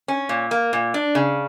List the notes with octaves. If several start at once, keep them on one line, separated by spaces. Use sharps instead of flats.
C#4
A#2
A#3
A#2
D4
C#3